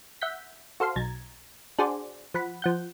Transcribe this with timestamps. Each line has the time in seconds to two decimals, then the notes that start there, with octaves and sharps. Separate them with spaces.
0.21 E5 F#5 G6 B6
0.80 F#4 A4 C5 F5 C6
0.96 B1 A#5 G#6 A6
1.79 D4 F#4 G#4 C5 D5
2.34 F3 F#5 B5
2.62 F3 F#5 G6